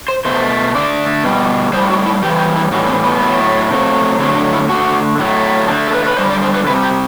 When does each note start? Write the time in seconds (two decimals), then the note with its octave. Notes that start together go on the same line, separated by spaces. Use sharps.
0.08 C5
0.25 B2 A3 C5
0.74 D3 A3 D5
1.24 B2 G3
1.73 A2 G3 C5
1.90 F#4
2.06 E4
2.22 A2 E3 G3 G4
2.39 G4
2.56 E4
2.71 A2 E3 G3 F#4
2.88 C4
3.05 B3
3.21 A2 F#3 A3
3.71 C3 F#3 A3
4.19 D3 F#3 A3 C4
4.36 D4
4.53 E4
4.69 D3 A3 F#4
5.18 A2 F#3 A3
5.68 D3 A4
5.71 A3
5.88 A4
5.93 B4
6.07 B4
6.17 D3 G3 C5
6.30 D5
6.42 C5
6.54 B4
6.67 C3 G3 B4
6.83 G4